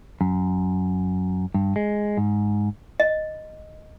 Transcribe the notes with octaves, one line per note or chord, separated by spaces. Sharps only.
F#2
G2
G#3
G#2
D#5